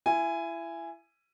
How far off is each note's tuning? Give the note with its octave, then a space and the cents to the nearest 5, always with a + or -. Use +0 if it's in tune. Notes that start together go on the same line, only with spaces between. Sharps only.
E4 +30 G#5 -5